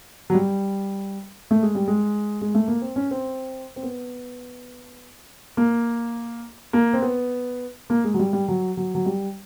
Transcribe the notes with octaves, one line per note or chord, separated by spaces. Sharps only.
F#3
G3
A3
G#3
G3
G#3
G#3
A3
A#3
C4
C#4
C4
C4
B3
A#3
A#3
C4
B3
A#3
G#3
F#3
G3
G3
F#3
F#3
F#3
G3